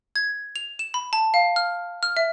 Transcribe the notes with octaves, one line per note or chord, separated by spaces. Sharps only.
G#6
F7
E7
B5
A5
F5
F6
F6
E5